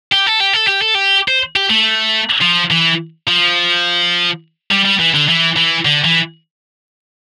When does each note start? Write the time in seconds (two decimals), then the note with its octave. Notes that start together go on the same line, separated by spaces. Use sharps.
0.13 G4
0.27 A4
0.40 G4
0.53 A4
0.67 G4
0.82 A4
0.95 G4
1.28 C5
1.56 G4
1.70 A3
2.41 F3
2.71 E3
3.28 F3
4.71 G3
4.86 G3
5.00 E3
5.14 D3
5.29 E3
5.56 E3
5.85 D3
6.05 E3